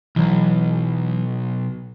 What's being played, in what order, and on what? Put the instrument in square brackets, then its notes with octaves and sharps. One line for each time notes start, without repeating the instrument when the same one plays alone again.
[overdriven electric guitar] B1 [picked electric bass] E3 F#3